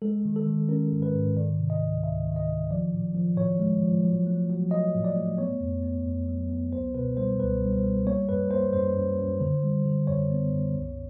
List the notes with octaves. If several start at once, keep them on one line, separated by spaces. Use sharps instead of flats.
G#3 A4
D#3
A4
D#3
C#4 A#4
G#2
B4
G#2
D#3 D5
C3
D#5
C#2
C#2 E5
D#3
D#5
D#3
F3 D5
A2
F3
A2 C#5
G#3
F3
F#3
A3
F#3
F#3 D#5
A2
D5
A3
B3 C#5
F2
B3
F2
F#3
B3
C#2 C5
B2 B4
G3 C5
C#2 B4
G3
C5
G3
A#3 C#5
F#2 B4
A#3 C5
F#2 C5
F#2
F#2
D3
G3
D3
F#2 C#5
B3
F#2
C2